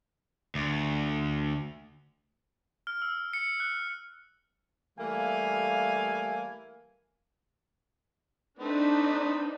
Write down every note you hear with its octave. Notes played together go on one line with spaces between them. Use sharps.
D2
F6
E6
C#7
F#6
E3 G3 A3 A#3 F5 G#5
A3 C4 D4 D#4 B4